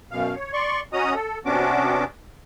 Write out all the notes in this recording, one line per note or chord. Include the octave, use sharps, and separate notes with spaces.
F#2 B2 F5
C#5
D5 C6 C#6
C#4 F#4 D#5 A#5 D#6
A4
C3 B3 C#4 D4 F#4 D6